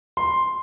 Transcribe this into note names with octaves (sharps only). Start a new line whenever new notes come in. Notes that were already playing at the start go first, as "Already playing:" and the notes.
C6